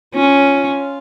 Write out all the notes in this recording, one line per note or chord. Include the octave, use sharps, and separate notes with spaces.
C#4 F4